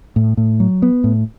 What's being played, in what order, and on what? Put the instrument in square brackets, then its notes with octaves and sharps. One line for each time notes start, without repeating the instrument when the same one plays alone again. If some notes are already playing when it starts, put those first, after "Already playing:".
[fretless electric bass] A2
A2
F#3
B3
A2